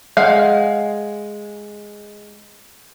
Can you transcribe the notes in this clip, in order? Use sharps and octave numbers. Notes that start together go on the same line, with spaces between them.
G#3 F5 F#5